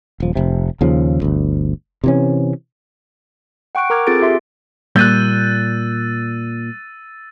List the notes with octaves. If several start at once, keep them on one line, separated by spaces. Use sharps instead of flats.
D#1 F3
F1 C3
D#2 C#3 F3
G1 D2
C3 E3 C#4
F#5 G5 C#6 F#6 D7
A#4 A#5 D6 F6 G#6
C4 F4 G#4 A4 A6 D7
F4 G4 E5 C6
A#2 G3 E6 F#6 G6 A6 D#7